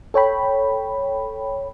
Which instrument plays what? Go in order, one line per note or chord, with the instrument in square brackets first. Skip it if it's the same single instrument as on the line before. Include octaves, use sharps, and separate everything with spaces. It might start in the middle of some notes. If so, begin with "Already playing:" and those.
[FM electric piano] A4 C#5 G5 B5